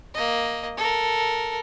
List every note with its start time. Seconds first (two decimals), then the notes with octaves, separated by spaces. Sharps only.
0.14 A#3 D#5
0.77 A4 A#4